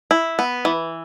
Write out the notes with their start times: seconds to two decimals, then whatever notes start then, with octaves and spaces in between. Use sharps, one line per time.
0.11 E4
0.39 B3
0.65 E3